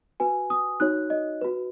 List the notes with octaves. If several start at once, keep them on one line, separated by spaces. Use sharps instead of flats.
F#4 B4 G#5
D#6
D#4 F#4 C#5 F#6
D#5
F#4 B4